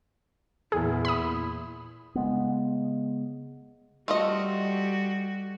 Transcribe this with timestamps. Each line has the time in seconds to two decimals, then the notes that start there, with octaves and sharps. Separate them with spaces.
0.72 E2 A#2 E4 G#4
1.05 B5 D#6
2.15 C#3 G#3 B3
4.08 G3 A3 F4 F#4 D#5